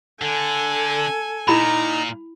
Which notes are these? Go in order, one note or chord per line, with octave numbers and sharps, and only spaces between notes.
D3 A4 G#5
A#2 D#4 E4 A#5 B5